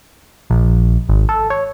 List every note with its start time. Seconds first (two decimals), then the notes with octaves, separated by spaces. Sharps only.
0.50 A#1
1.09 G#1
1.29 A4
1.50 C#5